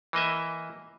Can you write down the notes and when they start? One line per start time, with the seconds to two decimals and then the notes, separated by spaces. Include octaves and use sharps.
0.13 E3 A#3 D#5 E5